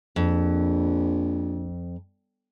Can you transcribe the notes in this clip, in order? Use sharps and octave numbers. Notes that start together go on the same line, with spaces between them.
A#1 F2